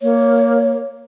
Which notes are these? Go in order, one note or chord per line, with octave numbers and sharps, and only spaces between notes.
A#3 C#5